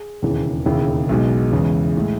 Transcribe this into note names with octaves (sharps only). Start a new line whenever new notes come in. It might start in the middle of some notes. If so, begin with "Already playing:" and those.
Already playing: G#4
E1 D#2 C#3 E3
E1 D#2 C#3 E4
B1 B2 G#3
E2 C#3 E3 G#3
A2 G#3